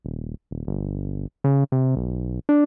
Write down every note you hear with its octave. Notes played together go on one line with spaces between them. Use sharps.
D#1
D#1
G1
C#3
C3
B1
D4